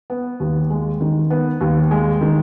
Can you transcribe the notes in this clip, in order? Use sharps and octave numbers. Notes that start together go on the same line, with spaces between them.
B3
D#2
G#3
D#3
B3
D#2
G#3
D#3